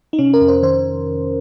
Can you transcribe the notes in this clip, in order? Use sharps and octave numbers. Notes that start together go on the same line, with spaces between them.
D#4
C3 C#4
A#4
F2
C5
D#3 C5